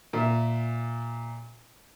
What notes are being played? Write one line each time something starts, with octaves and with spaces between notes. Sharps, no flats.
A#2 E5